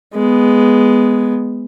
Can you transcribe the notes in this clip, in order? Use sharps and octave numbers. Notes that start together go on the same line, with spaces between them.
G#3 B3